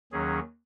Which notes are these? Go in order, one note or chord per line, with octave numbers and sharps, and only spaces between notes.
D#2 D#3 F#3 C#4 G#4